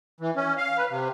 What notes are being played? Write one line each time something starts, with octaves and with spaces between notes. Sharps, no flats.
E3
C#4
F5
B4
C3